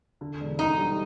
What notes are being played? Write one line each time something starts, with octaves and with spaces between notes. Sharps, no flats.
D3
E1
D2 D#4
G3